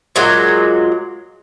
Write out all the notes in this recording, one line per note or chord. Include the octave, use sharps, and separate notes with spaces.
A#2 F#3 G#3